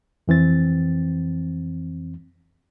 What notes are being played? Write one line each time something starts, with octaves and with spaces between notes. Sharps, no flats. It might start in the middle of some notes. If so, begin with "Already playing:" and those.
F2 E3 C4 A6